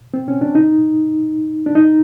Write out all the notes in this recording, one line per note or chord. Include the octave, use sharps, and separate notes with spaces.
C4
C#4
D4
D#4
D4
D#4